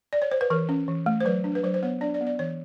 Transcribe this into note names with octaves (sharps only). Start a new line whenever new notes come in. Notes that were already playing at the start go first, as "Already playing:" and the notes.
D5
C#5
C5
B4
E3 A#4
C#4
E3
A3
C5
F#3 B4
D4
B4
F#3 C5
C5
B3 C#5
D4 D5
D5
B3
D5
E3 C#5